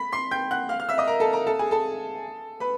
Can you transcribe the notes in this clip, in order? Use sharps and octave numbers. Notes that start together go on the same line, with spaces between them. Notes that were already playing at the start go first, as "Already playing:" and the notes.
Already playing: B5 B6
C6 C7
G5 G6
F#5 F#6
F5 F6
F5 F6
E5 E6
D#5 D#6
A#4 A#5
A4 A5
A#4 A#5
A4 A5
G#4 G#5
A4 A5
B4 B5